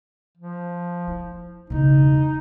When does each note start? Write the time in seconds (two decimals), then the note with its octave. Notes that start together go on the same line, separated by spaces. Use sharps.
0.37 F3
1.08 E4
1.70 E1 C#3 D#4